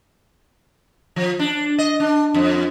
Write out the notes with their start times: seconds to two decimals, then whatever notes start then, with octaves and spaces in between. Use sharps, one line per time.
1.16 F3
1.39 D4
1.78 D#5
2.00 D4
2.34 F2